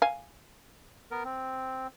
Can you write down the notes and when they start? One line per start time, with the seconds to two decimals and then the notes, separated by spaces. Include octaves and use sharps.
0.02 F5 G#5
1.11 B3 A#4
1.24 C4